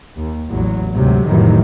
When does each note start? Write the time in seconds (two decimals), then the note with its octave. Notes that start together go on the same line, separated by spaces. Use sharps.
0.18 D#2
0.50 A1 E2 F#3
0.95 D2 G#2 C3 F#3
1.26 F1 A2 C3 D#3 E3 F#3